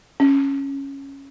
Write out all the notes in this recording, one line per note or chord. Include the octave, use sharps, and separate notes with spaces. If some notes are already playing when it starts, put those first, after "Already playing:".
C#4